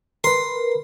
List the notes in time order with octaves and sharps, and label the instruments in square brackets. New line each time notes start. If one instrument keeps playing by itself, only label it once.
[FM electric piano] A#4 B4 [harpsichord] C6